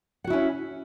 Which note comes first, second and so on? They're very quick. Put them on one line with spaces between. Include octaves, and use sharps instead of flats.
F#5 F#4 E4 C#4